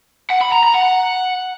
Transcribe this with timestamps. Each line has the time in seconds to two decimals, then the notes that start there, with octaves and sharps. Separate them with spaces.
0.30 F#5
0.41 B5
0.52 A#5
0.63 A#5
0.74 F#5